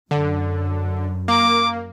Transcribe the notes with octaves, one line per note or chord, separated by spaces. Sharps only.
F#2 D3
A#3 D6